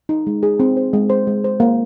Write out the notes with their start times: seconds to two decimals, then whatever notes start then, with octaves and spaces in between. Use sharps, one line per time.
0.09 D#4
0.27 G#3
0.43 G#4
0.60 C4
0.77 C5
0.93 G#3
1.10 C5
1.27 G#3
1.44 C5
1.60 A#3